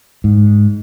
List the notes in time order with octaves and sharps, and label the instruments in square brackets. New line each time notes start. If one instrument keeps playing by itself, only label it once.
[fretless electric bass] G#2